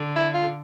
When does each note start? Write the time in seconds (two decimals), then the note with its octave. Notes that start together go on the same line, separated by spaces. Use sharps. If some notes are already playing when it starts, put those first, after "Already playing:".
Already playing: D3
0.16 E4
0.34 F4